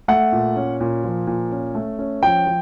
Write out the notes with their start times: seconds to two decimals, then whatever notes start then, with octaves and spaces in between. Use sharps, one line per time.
0.08 A3 F#5
0.32 A#2
0.56 C#4
0.80 A#2
1.04 F3
1.27 A#2
1.51 C#4
1.75 A3
1.99 C#4
2.23 F3 G5
2.46 F3